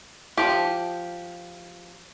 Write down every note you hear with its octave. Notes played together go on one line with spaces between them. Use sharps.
F3 G4